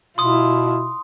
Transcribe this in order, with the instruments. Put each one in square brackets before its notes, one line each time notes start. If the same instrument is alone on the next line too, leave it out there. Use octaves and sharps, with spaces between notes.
[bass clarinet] B2 [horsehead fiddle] E4 F4 [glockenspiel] C6 D#6